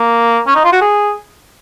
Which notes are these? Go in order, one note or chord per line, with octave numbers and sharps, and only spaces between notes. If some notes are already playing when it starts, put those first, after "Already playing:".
Already playing: A#3
C#4
D#4
F4
F#4
G#4